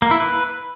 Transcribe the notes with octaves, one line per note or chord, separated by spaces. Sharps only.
A#3
E4
B4